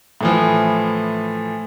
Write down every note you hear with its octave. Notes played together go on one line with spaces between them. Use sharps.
A2 E3 F3